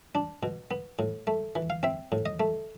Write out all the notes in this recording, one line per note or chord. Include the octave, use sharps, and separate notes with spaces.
D4
B2
B3
A2
A3
E3
F5
C4 E5
A2
D#5
A3